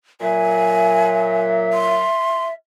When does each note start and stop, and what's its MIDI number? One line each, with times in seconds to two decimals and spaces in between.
0.21 2.04 46
0.21 2.04 54
0.21 2.53 76
0.21 1.41 80
1.73 2.46 84